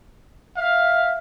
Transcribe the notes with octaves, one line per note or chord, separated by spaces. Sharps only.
E5 F5